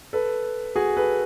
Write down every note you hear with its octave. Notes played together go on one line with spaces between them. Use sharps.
A4 B4
F#4 G#4
A4 B4